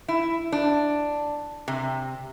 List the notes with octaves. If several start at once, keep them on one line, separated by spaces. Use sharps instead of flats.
E4
D4
C3